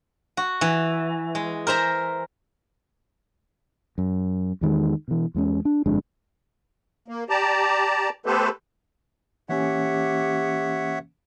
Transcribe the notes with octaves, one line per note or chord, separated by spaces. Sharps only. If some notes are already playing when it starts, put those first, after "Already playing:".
F#4
E3
G#3
A#4 C5 E5 A#5
F#2
E2 D#3 G#3
B2 E3
E2 G#3 C#4
D4
G1 F2 G#3 D4
A#3
G4 D5 A5 A#5
A3 B3 G4 A4 B4 C5
E3 A#3 C#4 G4 C#5 E5 F#5